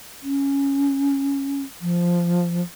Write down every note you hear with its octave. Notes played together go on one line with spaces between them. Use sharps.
C#4
F3